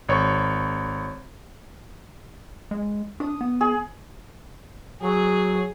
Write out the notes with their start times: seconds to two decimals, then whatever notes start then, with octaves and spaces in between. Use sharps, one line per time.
0.09 G#1 C#5 C#6
2.71 G#3
3.20 D4 D#6
3.41 B3
3.61 G#4
5.02 F#3 G#4